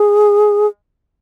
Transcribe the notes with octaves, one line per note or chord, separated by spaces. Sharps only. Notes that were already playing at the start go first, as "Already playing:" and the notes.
Already playing: G#4